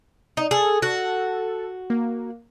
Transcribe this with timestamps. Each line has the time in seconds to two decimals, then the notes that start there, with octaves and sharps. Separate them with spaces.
0.37 D#4
0.51 G#4 A4
0.82 F#4
1.90 A#3